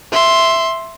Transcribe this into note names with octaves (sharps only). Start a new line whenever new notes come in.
E5 C6